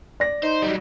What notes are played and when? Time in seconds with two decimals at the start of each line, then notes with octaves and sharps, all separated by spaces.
0.20 D5 A#6
0.43 D#4 C5
0.62 F#3 G3